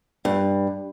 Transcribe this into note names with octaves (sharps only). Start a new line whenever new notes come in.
G2